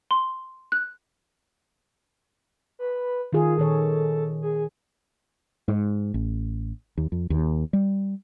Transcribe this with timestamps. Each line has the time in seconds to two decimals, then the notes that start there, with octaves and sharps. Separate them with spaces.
0.11 C6
0.72 F#6
2.79 B4
3.33 D#3 F4 G#4
3.58 A#2 D#3 A4 C#5
4.42 G#4
5.68 G#2
6.14 A1
6.97 D#2
7.12 F2
7.30 D#2
7.73 G3